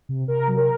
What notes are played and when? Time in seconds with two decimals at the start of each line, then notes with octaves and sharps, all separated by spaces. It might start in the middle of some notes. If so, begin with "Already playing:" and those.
0.09 C3
0.28 C3 A#4
0.47 F#3
0.57 A#4